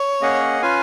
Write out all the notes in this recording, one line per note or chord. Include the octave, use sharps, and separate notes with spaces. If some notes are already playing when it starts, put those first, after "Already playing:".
Already playing: C#5
A#3 C#4 G#4 D#5 F#5
C#4 F4 B4 F5 G#5